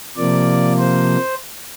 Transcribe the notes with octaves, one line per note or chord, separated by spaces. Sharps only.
C3 F3 A#3 D5
C5